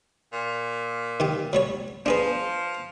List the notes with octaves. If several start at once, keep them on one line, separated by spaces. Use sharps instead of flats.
A#2
D#3 G4
F#3 G3 C#5
F3 D4 G#4 B4